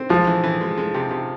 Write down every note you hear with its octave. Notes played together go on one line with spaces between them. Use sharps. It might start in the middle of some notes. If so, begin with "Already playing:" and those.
Already playing: C4
F3 G#3
E3
E3
G#3
G#3
C3
C3